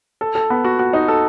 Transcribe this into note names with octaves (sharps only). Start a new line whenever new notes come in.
A4
A4
B3
F#4
F#4
D#4
A4